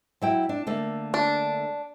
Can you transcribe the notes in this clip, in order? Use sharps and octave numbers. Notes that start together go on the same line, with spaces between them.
F#3 E4 G5
D4
D3 A3 A#3
D4